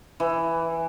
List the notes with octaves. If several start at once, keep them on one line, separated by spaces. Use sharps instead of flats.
E3